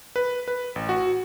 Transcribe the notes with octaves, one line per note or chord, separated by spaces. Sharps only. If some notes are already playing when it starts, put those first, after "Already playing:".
B4
B4
A1
F#4